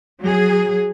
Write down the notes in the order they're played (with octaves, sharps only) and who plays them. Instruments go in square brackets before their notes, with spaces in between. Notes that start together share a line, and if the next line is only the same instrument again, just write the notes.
[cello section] F#3 G#4